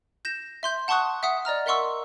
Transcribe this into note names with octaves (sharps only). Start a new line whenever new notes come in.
G6 A#6 E7
E5 C6 G6
F#5 A5 C6 C#6 D#6 F#6
E5 F#5 D#6 B6
D5 D#5 A#5 F6
A#4 E5 F#5 C6 C#6 E6